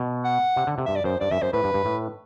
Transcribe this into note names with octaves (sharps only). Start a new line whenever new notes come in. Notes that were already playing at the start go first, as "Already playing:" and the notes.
Already playing: B2
F#5
C3
D3
C3
G2 E5
D5
F#2 C5
G2 D5
F#2 E5
F#2 C5
A2 B4
G2
G2
A2